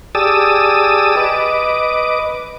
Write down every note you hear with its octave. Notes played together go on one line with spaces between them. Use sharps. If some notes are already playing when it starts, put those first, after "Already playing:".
G4 G#4 D5 A5 D#6 E6
B4 D#5 D6